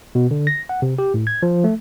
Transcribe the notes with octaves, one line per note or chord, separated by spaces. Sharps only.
B2
D3
A#6
F#5
C3
G4
A2
G#6
F3
A3